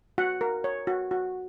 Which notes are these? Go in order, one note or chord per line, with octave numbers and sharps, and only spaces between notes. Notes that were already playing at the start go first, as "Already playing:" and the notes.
F#4 F#5
A#4
C#5
F#4
F#4